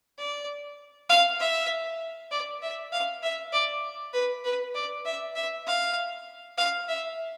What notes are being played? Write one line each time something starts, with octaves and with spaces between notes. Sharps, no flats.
D5
F5
E5
D5
E5
F5
E5
D5
B4
B4
D5
E5
E5
F5
F5
E5